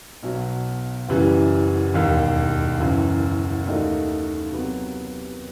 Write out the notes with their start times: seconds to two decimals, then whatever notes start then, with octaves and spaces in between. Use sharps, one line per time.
0.23 B1 B2 F#3
1.09 F#1 F#2 E3 G3
1.94 E1 D#2 D#3
2.80 F#1 F#2 E3
3.67 D#2 D#3 A3 D#4 F#4
4.52 C3 F#3 B3